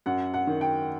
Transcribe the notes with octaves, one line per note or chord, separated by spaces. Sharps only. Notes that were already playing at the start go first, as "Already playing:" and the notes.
F#2 F#5
F#5
D#3
G5